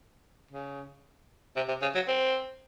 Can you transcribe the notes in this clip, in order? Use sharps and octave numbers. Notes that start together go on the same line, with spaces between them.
C#3
C3
C3
C#3
F#3
C4